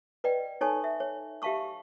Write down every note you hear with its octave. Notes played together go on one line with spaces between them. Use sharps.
B4 D5 D#5 G5
D#4 A4 C#5 G#5 A5 C#6
E5
C#5
G4 E5 F5 A5 C#6 E6